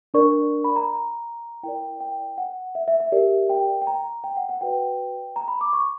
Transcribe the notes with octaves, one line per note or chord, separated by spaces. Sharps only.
D4 A#4 D5 C#6
B5
A#5
E4 A#4 D5 G5
G5
F#5
E5
E5
E5
G4 A#4 D5
G5
G5
A#5
G5
F#5
F#5
F#4 B4 D5 G5
A#5
B5
D6
C#6